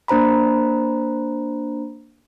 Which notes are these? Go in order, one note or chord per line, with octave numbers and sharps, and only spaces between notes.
A#3 D4 C5 A#5 B5